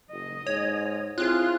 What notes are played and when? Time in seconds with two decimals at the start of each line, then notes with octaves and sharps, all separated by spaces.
0.11 F#1 D#5
0.47 G#2 C#5
1.18 C4 E4 F4 G#4 F#6